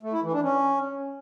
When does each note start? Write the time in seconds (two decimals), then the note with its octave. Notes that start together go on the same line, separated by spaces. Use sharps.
0.03 A3
0.13 E4
0.23 E3
0.33 D4
0.43 C#4